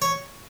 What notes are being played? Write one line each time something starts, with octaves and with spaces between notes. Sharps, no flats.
C#5